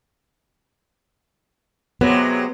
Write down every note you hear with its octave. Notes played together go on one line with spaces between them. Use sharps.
C3 F#3 G#3 B3